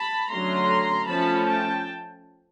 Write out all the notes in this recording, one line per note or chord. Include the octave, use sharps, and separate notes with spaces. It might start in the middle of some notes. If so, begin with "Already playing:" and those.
Already playing: A5 B5
D3 F#3 A3 C#4 A#5 C6
F3 A3 C#4 A5 B5
G5 A5